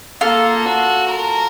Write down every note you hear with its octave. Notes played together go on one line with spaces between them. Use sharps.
A#3 F4 A4
F#4
A#4